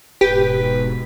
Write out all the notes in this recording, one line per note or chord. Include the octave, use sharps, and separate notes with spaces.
E1 G#2 B2 G4 B4